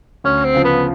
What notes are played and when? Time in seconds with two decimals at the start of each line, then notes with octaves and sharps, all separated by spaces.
0.24 D2 C#4
0.44 C4
0.54 C#3 F3
0.64 B3